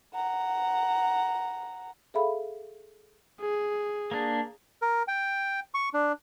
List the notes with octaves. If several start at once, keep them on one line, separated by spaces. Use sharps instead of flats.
F#5 A#5
G#4 A4 E5 F5 B5
G#4
A#3 D4
A#4
G5
C#6
D4